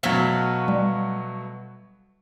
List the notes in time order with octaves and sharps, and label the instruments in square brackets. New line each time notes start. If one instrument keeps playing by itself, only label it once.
[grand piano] B2 F#3 [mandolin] A3 B4 F5
[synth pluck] G3